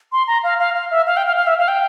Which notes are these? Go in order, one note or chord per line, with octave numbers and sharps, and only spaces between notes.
C6
A#5
F5
F5
F5
E5
F5
G5
F5
F5
E5
F5
G5